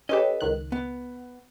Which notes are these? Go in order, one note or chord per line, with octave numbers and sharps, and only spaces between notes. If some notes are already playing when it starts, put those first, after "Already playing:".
C#4 G4 A4 B4 D#5
C#2 D#3 F#6
B3